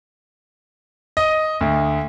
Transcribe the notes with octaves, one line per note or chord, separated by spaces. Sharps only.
D#5
D2